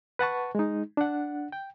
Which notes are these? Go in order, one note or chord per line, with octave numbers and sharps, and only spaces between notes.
B4 F#5 A5 C#6
G#3 D#4
D4 F#5
G5